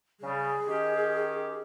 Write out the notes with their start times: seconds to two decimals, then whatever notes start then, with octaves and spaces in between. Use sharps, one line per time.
0.21 C#3 G3 G#4
0.66 D#3 C#4 G4